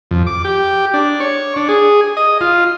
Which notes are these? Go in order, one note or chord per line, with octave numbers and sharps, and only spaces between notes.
F2
D6
G4
D4
C#5
D4
G#4
D#5
F4